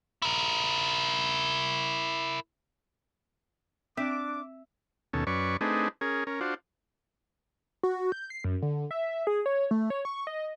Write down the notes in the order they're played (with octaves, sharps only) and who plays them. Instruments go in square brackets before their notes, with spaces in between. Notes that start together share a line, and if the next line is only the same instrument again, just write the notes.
[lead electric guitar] E4 A#4
[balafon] C4 [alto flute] D4 [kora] E5 [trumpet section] D6
[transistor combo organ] D#2 B2 C#4 A4
F#2 C#4 B4 D5 C#6
A3 C4 D4 D#4 G#4 B4
C#4 G#4 A#4
C#4 A#4
D4 F4 F#4 C5
[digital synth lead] F#4
G6
C7
F#2
D3
E5
G#4
C#5
A3
C#5
C#6
D#5